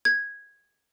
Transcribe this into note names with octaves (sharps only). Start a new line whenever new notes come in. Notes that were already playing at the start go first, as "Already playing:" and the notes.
G#6